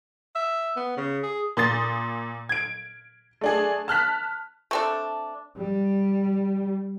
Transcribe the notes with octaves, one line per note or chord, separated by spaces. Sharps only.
E5
B3
C#3
G#4
A#2 C6 D#6 A6
G#6 D7
A3 D4 G#4
A5 F6 F#6 B6
A3 C4 D4
G3